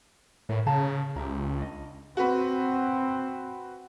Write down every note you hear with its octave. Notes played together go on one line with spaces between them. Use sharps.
A2 A#4 C#5 B5
C#3 F5 A5 A#5
C#2 G4 E5 A#5
D4 D#5
C4 F#4 B4